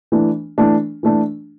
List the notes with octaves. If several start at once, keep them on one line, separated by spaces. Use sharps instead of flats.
E3 A3 D4
E3 A3 D4
E3 A3 D4